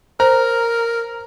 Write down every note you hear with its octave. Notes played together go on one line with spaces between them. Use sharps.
A#4 C5 A#5